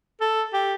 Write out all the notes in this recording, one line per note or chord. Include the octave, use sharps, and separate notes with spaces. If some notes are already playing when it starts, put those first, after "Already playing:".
A4
G4